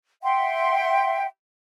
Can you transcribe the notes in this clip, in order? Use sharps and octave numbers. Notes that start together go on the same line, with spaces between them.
E5 F#5 G5 C6